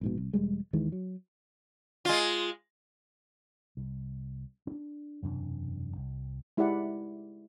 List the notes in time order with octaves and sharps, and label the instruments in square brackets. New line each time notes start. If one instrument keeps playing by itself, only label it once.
[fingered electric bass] A#1 G#2 B2
C2
E1 G3 G#3
D#2 D#3 E3 G#3
F#3
[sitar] G#3 F4
[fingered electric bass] C2
C#4 D4
E1 F#2 C3 D4
C2
[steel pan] G#3 E4 G4 G#4 D5 F#5